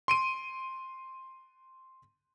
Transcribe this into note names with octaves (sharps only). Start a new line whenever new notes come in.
C6 D7 D#7